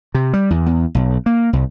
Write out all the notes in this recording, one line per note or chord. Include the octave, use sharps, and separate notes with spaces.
C3
G3
E2
E2
B1
A#3
C2